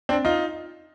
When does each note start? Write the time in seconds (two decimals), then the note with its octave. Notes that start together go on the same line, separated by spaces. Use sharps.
0.09 C4 D4
0.25 D#4 F4